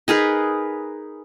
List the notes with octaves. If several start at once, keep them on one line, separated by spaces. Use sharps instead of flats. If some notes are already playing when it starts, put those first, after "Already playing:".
D#4 G#4 A#4 B4